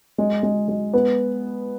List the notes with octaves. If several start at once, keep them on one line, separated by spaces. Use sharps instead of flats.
G#3
G#3
G#3
B3